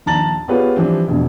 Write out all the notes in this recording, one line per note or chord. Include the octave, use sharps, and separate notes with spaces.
A#1 D#2 A5 A#5 A6 F#7
B3 F4 G4 G#4 B4 C#5
E3 F3 G3 C4 D4
E1 A#1 B2